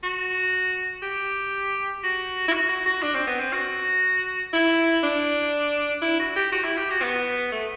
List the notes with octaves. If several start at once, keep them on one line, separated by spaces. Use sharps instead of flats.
F#4
G4
F#4
E4
F#4
F#4
F#4
D4
C4
B3
C4
F#4
E4
D4
E4
F#4
G4
F#4
E4
G4
F#4
B3
A3